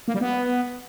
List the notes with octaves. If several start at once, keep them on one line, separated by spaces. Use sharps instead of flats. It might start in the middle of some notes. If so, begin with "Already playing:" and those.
A#3
G3
B3